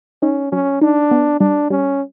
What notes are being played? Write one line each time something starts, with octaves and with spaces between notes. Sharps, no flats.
C#4 D#4
F#3 C#4
D4 D#4
B3
G3 D4
G3 C#4